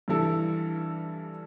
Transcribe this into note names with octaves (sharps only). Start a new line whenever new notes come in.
G2 E3 G3 E4 A4